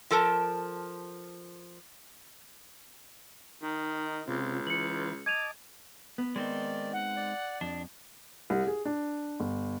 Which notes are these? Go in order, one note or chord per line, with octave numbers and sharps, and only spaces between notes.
F3 A4 A#4 A5
D#3 D#4
C#2 C3 C4 F4
E3 B4 C#7 F#7
D#5 A5 D6 G#6 D#7 F7
B3
D#3 G#3 C4 D#4 D5
F#5
D5
F2 D4
C2
G#4
D4
G1